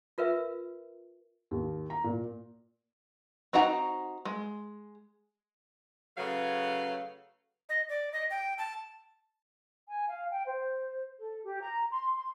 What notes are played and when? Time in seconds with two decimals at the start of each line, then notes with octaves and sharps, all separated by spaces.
0.18 F4 A#4 B4 E5
1.51 D#2
1.90 A#5
2.04 A#2
3.53 C4 D#4 F#4 F#5 A#5
4.25 G#3
6.18 C#3 F#3 A3 B4 F5
7.69 D#5
7.89 D5
8.13 D#5
8.30 G5
8.58 A5
9.89 G#5
10.08 F5
10.31 G5
10.45 C5
11.19 A4
11.44 G4
11.62 A#5
11.91 C6
12.15 C6